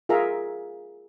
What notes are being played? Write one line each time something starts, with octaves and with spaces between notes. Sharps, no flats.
F4 G#4 A#4 E5 A#5